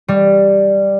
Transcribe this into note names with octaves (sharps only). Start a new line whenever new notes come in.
G3